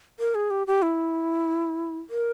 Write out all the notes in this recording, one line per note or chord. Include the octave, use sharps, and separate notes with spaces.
A#4
G#4
G4
G4
E4
A#4